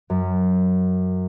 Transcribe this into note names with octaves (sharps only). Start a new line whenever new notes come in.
F#2